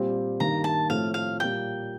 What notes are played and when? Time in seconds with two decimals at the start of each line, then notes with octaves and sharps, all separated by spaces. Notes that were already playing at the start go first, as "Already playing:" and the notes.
Already playing: A#2 G3 C4 G4
0.40 G2 D#3 A#3 A#5
0.64 A5
0.89 A2 F3 A3 C4 F5
1.14 F5
1.40 A#2 G3 A#3 G5